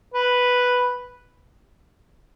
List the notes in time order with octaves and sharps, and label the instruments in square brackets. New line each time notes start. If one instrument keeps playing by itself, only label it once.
[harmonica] B4